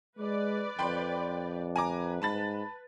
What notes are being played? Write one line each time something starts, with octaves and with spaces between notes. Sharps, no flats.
G#3 B4 D5
F2 G5 B5 C6
B4 G#5 A#5 D6
G#2 A5 B5 A6